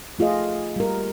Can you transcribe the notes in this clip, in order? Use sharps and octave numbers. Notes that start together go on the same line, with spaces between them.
A3 F4 G#4 D#5
G3 A#4